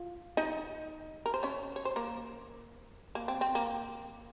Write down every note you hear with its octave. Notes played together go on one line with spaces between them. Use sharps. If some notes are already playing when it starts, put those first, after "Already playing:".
Already playing: F4
D#4 D#5
A#4
C5
C#4 C#5
C#5
C5
A#3 A#4
A#3
C4
C4
A#3